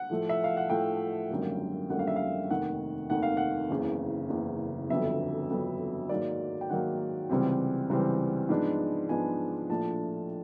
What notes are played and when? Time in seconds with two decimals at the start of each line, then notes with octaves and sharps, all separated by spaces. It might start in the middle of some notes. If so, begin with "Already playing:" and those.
Already playing: F#5
0.10 A2 F3 A3
0.29 E5
0.44 F5
0.57 F#5
0.70 A2 F3 A3 G5
1.30 G#1 F#2 D3 G3 A#3
1.89 G#1 F#2 D3 G3 A#3 F#5
1.99 F5
2.07 E5
2.16 F5
2.50 F1 D#2 D#3 F#5
3.10 F1 D#2 D#3 F#5
3.23 F5
3.37 F#5
3.70 F#1 E2 C#3
4.30 F#1 E2 C#3
4.89 G1 F2 D3 F#3 B3 E5
5.50 G1 F2 D3 F#3 B3
6.09 G#2 D#3 F#3 A#3 D5
6.61 G5
6.70 G#2 D#3 F#3 A#3 F#5
7.29 C#2 C3 E3 G3 C4
7.90 C#2 C3 E3 G3 C4
8.49 G#2 F3 G#3 B3 D4
9.09 G#2 F3 G#3 B3 D4 G#5
9.69 A#1 A2 F3 A3 D4 A5